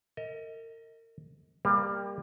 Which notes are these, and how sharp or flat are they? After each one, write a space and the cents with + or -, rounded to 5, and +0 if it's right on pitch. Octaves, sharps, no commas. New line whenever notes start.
A#4 -35 D#5 +25
G3 +25 A#3 +0